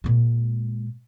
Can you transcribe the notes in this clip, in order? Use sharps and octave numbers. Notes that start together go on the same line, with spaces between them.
A#2 G#3